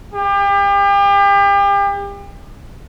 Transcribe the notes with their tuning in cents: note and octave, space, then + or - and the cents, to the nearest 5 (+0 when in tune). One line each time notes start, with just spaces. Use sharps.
G4 +35